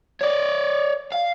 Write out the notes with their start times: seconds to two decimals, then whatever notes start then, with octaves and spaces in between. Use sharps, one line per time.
0.21 C#5 D5
1.12 F5